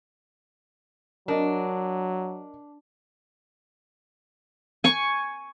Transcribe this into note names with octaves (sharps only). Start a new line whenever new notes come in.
F#3 D4 A#4 D#5
G#5 C#6